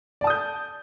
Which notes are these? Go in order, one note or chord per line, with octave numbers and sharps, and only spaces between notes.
D5 A5 D#6 G6